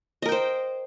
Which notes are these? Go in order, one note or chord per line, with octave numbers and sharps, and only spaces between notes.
A#4 C5 D#5 G5